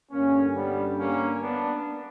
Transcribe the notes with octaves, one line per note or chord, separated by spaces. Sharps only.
G2 D3 A#3 C#4
G3 B3
A#3 C#4
B3 D4